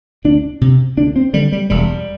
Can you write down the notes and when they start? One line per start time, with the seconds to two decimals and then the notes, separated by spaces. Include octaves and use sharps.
0.25 D2 D4
0.61 C3
0.97 D2 D4
1.16 C4
1.33 D3 G3
1.52 G3
1.70 E1 G3